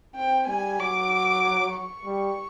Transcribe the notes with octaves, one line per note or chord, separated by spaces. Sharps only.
C4 G5
G3 G#5
F#3 D6
C#6
G3